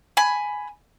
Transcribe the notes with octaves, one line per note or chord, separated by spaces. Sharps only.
G#5 B5